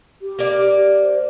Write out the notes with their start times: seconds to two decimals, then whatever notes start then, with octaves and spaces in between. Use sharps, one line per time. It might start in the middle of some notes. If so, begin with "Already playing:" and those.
0.22 G4
0.39 A#3 D5
1.03 C5